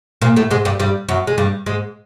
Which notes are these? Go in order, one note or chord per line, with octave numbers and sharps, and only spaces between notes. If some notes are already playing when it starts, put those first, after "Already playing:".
A#2 A#3
A2 A3
G#2 G#3
G2 G3
G2 G3
F#2 F#3
G#3
G2 G3
G#2 G#3